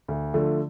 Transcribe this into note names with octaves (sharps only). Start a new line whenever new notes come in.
D2
D3 F3 A3